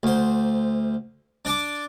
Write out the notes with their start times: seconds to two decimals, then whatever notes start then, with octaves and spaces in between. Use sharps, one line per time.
0.03 D2 C5
1.45 D4 D5 A5 D6